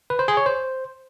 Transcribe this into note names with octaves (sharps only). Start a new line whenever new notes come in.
B4
C5
G#4
C#5
C5